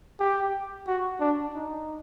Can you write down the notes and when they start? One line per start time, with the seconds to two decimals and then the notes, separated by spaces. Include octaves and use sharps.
0.20 G4
0.88 F#4
1.20 D4
1.54 D#4